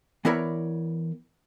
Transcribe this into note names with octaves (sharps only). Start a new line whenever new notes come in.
E3 B3 E4 A#4 C#5 D5